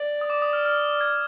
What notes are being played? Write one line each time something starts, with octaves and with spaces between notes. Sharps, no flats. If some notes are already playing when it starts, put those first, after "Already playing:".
Already playing: D5
D#6
D6
D#6
F6
F6
G#6